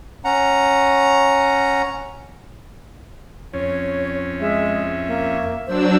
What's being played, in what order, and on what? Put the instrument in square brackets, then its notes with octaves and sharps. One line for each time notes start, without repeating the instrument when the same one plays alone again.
[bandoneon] C#4 F#5 A#5
[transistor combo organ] F2 C#4 [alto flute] C#5
[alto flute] G#3 [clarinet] E5
[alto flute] A#3
[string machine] F#3 D4 E6 [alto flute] C5